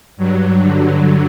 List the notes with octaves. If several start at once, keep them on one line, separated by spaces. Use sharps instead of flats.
G2 F#3
G2 D3 F#3